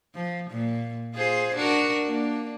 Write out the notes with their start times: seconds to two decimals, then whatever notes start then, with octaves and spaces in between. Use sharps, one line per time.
0.15 F3
0.50 A#2
1.14 F4 G#4 C5
1.55 D4 F#4 A#4
2.05 A#3 D4